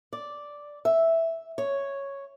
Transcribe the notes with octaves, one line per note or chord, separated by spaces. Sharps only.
D5
E5
C#5